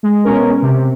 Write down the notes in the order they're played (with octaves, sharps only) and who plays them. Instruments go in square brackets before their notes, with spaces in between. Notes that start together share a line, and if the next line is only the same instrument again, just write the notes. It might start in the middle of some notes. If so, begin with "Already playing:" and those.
[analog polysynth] G#3
B2 G#3 C#4 A#4
C3